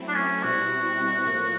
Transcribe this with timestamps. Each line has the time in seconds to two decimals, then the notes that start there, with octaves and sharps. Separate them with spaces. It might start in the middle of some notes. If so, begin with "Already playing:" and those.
Already playing: F#3 A3 C4 E4
0.08 D4
0.14 C#4
0.43 B2 G3 C4 E4 F#4
1.26 A2 F3 A#3